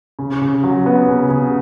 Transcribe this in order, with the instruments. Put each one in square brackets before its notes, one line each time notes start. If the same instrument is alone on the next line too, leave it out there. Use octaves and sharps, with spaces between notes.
[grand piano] C#3
C#3
F#3
B3
C#3
C#3